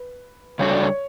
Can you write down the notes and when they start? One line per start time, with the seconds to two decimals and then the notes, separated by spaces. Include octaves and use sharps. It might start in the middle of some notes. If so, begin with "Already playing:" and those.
Already playing: B4
0.59 C#3 G3 D4 F#4 A4 C#5
0.70 D5
0.81 C#5